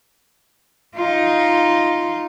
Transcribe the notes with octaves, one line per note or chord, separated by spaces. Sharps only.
D#4 F4